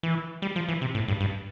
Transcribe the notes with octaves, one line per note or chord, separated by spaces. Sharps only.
E3
G3
F3
E3
C3
A2
G2
G2